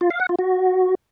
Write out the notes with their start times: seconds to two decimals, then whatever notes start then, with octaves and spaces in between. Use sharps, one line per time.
0.01 F4
0.10 F5
0.20 F#5
0.29 F4
0.39 F#4